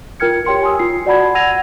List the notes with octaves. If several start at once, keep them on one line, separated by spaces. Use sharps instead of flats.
F4 A#4 G5 F6 G#6 C#7
G4 C#5 G5 C6 C#7
G#5 C6 D#6 E6
F4 C7
F#4 D5 F#5 A5 B5 G#6
F#5 E6 G#6 A#6 D#7 F7